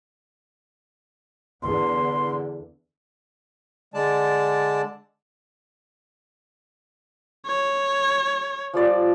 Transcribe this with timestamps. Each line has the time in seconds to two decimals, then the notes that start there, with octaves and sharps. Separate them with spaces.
1.63 E2 D3 C6
3.94 D3 G#3 D5 A5
7.47 C#5
8.73 F3 G3 D5